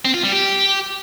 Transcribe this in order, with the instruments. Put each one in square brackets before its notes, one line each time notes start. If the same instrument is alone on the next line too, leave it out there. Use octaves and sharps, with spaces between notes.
[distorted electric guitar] C4
F4
G3
G4